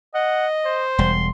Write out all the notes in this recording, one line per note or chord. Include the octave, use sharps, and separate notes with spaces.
D#5 F#5
C5
E1 G3 C6